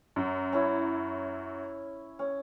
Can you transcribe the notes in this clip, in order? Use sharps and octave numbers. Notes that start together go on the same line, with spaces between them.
F#2
C#4 E4
C#4